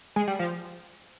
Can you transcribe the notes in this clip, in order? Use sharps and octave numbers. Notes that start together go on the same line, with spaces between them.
G#3
G3
F3